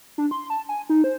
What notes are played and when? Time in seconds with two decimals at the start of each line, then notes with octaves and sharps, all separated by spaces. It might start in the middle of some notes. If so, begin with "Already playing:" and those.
0.18 D4
0.31 C6
0.50 A5
0.69 G#5
0.90 D#4
1.04 C5